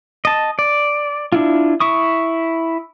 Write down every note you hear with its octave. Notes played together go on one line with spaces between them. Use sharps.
D#5 A5
D5
D4 E4 F4
E4 C#6 D#6